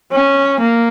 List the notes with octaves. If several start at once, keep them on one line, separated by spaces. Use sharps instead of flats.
C#4
A#3